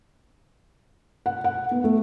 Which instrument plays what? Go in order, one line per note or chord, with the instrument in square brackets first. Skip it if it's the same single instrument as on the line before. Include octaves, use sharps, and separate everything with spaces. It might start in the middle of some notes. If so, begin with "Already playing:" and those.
[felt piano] F#5
F#5
B3
A3